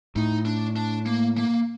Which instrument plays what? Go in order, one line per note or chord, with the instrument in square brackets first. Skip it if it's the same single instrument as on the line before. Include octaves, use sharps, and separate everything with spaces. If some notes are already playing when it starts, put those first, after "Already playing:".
[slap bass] A2 [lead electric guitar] D#4
[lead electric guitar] D4
D4
A#3
A#3